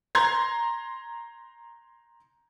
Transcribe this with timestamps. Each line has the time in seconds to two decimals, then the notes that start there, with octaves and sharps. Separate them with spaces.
0.15 A#5 C6 G#6